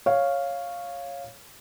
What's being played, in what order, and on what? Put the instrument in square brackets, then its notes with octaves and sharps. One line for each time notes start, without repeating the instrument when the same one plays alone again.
[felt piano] C#5 F5